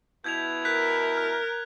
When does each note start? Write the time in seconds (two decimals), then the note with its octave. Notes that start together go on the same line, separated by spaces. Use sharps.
0.24 B2 E4 G6 G#6 F7
0.65 A#4 F#6 G6 B6
1.17 F6